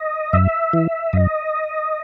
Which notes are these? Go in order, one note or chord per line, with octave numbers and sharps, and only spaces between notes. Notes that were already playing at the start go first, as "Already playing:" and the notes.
Already playing: D#5
F#2 E5
E3
F#2 D#5